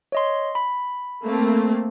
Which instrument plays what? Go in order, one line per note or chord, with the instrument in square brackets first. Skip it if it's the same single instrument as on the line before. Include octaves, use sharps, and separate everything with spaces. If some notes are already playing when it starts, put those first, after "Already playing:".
[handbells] C#5 D#5 C6
B5
[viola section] A3 A#3 C4